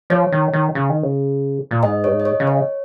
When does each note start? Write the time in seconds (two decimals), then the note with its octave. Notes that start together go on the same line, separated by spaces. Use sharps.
0.10 F3 C#5
0.32 D#3
0.53 D#3
0.75 C#3
0.89 D#3
1.03 C#3
1.71 A#2
1.83 G#2 D#5
2.04 G2 C#5
2.12 G#2
2.20 D#5
2.25 C#5
2.40 C#3
2.47 C#5